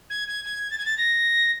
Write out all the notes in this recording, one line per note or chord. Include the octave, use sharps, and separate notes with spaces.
G#6
G#6
G#6
A6
G#6
A6
A#6